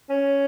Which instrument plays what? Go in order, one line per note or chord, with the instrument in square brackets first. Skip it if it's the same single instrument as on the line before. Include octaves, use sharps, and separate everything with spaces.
[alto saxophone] C#4